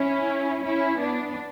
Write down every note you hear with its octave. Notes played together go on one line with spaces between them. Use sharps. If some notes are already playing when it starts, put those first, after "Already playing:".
Already playing: C#4 E4
C#4 E4
B3 D4